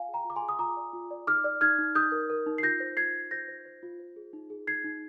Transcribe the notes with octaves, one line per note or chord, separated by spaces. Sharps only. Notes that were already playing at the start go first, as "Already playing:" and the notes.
Already playing: F4 F5 G#5
G#4
G5 A#5
F4
D6
G#5 C6
G#4
D#6
F4 A#5 D6
D5
F4
D5
D#4 D6 F6
D5
D#4 F6 G#6
D#4
D#4 D#6 G6
A#4
A#4
D#4
C7
F4 G6 A#6
C5
F4 G#6 C7
C5
C5 G6 A#6
C5
C5
F4
C5
G#4
D#4
G#4
D#4 G#6 C7
D#4